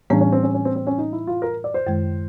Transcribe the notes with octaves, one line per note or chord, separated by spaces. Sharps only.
A2 E3 G3 B3 C#4 D4
C#4
C4
C#4
C#4
C4
C4
C#4
D#4
E4
F4
A#4
D5
C5
F#2 D#3 G#3